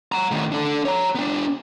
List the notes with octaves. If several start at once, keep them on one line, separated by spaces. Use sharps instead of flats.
F#5 A#5
A2 D#3
D4 A4
C#5 A#5
B3 D4